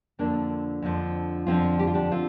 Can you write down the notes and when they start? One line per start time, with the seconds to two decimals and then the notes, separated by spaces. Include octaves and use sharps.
0.19 F2 D3 F3 A#3 D4
0.82 F2 D3 F3
1.47 F2 D3 F3 C4 F4
1.79 G4
1.87 F4
1.94 D4 G4
2.11 D3 C4 F4